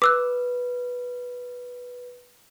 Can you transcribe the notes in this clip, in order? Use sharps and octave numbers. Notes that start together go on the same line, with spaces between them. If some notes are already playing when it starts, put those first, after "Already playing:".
B4 D6 E6 F#6